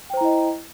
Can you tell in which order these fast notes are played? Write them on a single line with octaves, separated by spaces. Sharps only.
G5 C5 A#5 E4 D#5